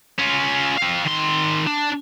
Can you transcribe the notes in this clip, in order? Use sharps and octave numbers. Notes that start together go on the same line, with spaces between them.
C#4 F4
C4 F5
D#3 C6
D4